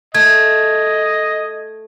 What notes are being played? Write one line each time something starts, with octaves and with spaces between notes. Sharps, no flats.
A3 D#5 G#6